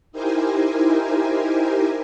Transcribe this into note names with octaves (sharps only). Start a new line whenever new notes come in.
D#4 E4 G4 A#4 C5 G#5